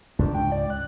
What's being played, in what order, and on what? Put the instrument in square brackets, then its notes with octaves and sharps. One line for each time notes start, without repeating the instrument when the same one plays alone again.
[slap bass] C#2 G#2 [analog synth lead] D4
[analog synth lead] G5
D5
F#6